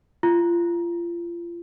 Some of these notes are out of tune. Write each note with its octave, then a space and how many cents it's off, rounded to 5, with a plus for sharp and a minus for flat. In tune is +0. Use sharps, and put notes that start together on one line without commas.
F4 -30